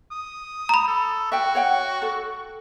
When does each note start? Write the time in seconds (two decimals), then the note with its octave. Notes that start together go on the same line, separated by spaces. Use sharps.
0.11 D#6
0.69 A#5 B5
0.88 A4
1.32 F#4 E5 G5
1.55 C#5 F#5 G5
2.02 A4